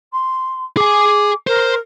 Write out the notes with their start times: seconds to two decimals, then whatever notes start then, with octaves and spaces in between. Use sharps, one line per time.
0.12 C6
0.77 G#4 G#5 D6
1.47 A#4 C5